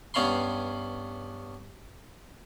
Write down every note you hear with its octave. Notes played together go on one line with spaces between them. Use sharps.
G2 B3 C#4 F5 B5 C6